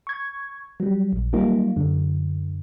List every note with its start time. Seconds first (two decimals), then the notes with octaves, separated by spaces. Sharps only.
0.07 C#6 G#6
0.80 F#3 G3
1.13 A#1
1.33 F#3 G3 A#3 D#4 F4
1.76 F#2 D3